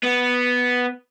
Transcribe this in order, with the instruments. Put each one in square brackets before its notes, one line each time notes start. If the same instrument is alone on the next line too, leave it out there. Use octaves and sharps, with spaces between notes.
[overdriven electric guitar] B3